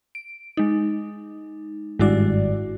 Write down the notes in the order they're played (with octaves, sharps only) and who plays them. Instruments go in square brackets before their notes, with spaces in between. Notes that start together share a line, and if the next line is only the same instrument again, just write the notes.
[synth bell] D7
G#3 D#4
[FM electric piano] G#1 G2 D5 [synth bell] G#3 E4 F#4